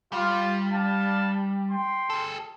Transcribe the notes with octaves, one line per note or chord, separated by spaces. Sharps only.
G3 F4
D4 F5 A5
G5 C6
G#4 A4